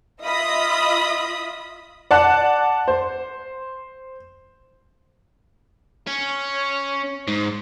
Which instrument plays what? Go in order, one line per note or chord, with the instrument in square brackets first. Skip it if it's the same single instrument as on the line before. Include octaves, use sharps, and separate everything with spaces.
[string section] F4 D#5 E5 B5 D#6
[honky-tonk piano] D5 F#5 A5 F#6
C5
[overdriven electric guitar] C#4
G#2